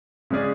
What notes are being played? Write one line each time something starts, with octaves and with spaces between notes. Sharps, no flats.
C#3 G#3 C#4 G#4 D5